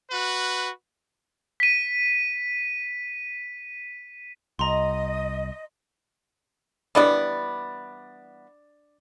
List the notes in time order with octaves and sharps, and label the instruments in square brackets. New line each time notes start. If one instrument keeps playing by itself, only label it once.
[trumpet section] F#4 B4
[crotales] B6 D#7
[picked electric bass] C2 [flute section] D#5 [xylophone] A#5 C6
[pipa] E3 G3 B3 [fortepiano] D4 D5